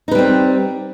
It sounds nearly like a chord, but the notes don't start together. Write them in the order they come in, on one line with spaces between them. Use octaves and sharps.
D#4 B4 G3 C4